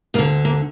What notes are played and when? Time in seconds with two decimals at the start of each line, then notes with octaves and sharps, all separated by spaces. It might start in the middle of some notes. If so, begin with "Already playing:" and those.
0.14 D2 A#3
0.19 D3
0.45 A#3